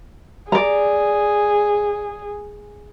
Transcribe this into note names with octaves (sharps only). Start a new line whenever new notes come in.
G#4 D5 A#5